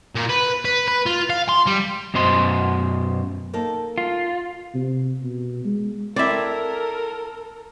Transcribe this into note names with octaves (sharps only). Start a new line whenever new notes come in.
A#2
B4
B4
B4
F4
F5
C6
G3
F#2 B2 C5 D#5 C6
A#3 D#4 A4
F4
C3
B2
G#3
C4 E4 A4 A#4 D5 E5 G5